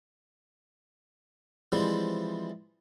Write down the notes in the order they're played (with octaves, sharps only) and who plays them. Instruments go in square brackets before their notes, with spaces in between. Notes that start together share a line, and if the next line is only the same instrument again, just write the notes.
[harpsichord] E3 F3 G3 G#3 C4 E4